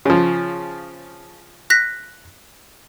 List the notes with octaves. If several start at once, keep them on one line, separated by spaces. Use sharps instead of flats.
C#3 F3
F#6 A#6 B6